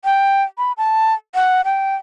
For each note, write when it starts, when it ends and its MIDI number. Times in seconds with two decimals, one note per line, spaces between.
0.05 0.42 79
0.58 0.72 83
0.78 1.14 81
1.35 1.62 78
1.65 1.95 79